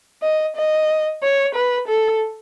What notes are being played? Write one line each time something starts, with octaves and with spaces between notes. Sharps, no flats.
D#5
D#5
C#5
B4
A4